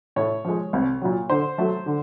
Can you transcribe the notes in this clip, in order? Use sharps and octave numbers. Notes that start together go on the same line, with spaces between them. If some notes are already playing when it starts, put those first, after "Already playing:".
A2 C#5
F3 G#3
C2
A#2 F#3
D3 C5
F#3 A3
D3